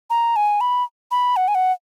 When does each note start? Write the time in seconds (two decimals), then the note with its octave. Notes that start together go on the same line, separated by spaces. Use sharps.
0.10 A#5
0.36 G#5
0.61 B5
1.11 B5
1.36 F#5
1.48 G#5
1.55 F#5